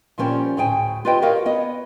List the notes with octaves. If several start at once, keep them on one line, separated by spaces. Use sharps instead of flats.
A#2 F3 G3 C#4 C5 G5
D2 A2 G#4 G5 G#5
F4 G4 B4 C5 D#5 G5
F#4 G4 A#4 C#5 D#5 F5
B3 C#5 D#5